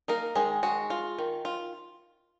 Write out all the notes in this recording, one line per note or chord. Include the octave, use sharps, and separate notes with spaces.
A#3 D#4 A#4
D#3 G#3 G#4
G#3 F#4
F4
D#3
F4